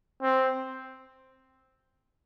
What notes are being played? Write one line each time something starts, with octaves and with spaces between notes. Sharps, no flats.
C4